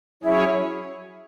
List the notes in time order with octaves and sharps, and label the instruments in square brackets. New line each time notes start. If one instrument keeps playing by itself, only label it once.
[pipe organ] F#3 C#4 G#4 C#5 [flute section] E4